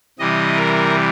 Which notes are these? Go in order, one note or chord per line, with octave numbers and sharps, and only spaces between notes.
C3 E3 G3 D#5
A#4